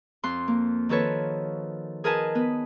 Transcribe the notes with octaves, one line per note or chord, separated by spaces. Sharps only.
F2 C6 F#6
A#3
D#3 F3 F#4 A4 B4 C#5
G#4 A#4 B4 D#5 G#5 A5
B3 B4